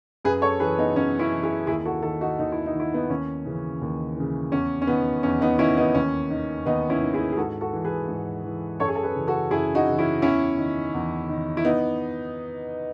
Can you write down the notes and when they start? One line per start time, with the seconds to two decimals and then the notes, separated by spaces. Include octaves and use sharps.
0.25 F#2 G#4 B4
0.42 A4 C#5
0.60 E3 G#4 B4
0.78 B3 D#4
0.95 F#2 C#4
1.19 C#4 E4
1.31 E3
1.43 E4 G#4
1.67 D#2 E4 G#4
1.85 F#4 A4
2.03 D#3 F#4 A4
2.21 D#4 F#4
2.39 D#2 D#4
2.52 E4
2.66 D#4
2.74 D#3
2.80 E4
2.94 B3 D#4
3.09 D#2 C#4
3.45 C#3 E3
3.81 D#2
4.16 C#3 E3
4.52 E2 C#4
4.82 C#4
4.87 D#3 B3
5.23 E2 C#4
5.41 B3 D#4
5.59 D#3 C#4 E4
5.77 B3 D#4
5.95 D#2 C#4
6.30 D#3
6.66 D#2 B3 D#4
6.90 C#4 E4
7.01 D#3
7.14 E4 G#4
7.32 G#4
7.37 G#2 F#4 A4
7.61 F#4 A4
7.73 E3
7.85 G#4 B4
8.09 G#2
8.44 E3
8.80 F#2 A4 C#5
8.88 G#4
8.95 A4
9.03 G#4 B4
9.15 C#3 E3
9.27 F#4 A4
9.51 F#2 E4 G#4
9.75 D#4 F#4
9.87 C#3 E3
9.98 C#4 E4
10.22 E2 C#4 E4
10.58 D#3
10.94 E2
11.29 D#3
11.57 E4
11.65 B3 D#4